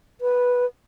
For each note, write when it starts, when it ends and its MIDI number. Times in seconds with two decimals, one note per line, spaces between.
0.21 0.65 71